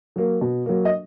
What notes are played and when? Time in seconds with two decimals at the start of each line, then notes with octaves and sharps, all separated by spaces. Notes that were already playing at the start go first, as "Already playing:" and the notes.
0.16 F#3 A#3
0.41 B2
0.66 F#3 A#3
0.85 D#5